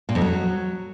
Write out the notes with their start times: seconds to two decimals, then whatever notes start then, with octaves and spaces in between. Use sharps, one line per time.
0.09 A#2
0.15 F2
0.21 F#3